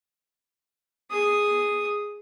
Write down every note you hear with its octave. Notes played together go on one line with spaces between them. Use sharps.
G#4 D#6